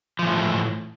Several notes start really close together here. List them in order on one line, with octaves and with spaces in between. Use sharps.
F3 E3 A2